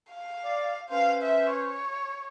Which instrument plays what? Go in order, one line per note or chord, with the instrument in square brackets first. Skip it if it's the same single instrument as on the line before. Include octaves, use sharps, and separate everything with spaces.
[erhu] F5
[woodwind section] D5
[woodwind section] C#4 B4 C5 [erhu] F5
[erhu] E5
C#5